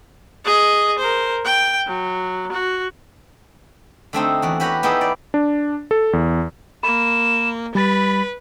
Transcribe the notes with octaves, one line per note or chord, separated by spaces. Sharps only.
G#4 D#5
A#4 C5
G5
F#3
F#4
D3 A3 C4 D#4
E2 F#4
F#4 G4 B4 C#5 A#5 B5
B3 D#4 E4 G4 G#4
D5
D4
A4
E2
A#3 B5 E7
G3 B4 B5 A6